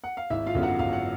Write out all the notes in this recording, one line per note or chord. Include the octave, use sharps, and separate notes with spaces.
F#5
F5
G#1 E4 E5
F4 F5
F#2 D3 F#3 B3
F#4 F#5
G#1 F5
F#5